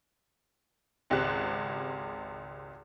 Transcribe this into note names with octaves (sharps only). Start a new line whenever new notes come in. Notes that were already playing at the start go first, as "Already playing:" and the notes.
G#1 C#2 C4 G4 F#6